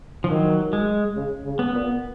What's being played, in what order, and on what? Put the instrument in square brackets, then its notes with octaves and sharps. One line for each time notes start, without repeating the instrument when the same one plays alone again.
[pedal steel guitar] F3
[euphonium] D#3 [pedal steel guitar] F#3
[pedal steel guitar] G#3
[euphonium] C#3
C#3
[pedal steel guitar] B3
[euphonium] A#2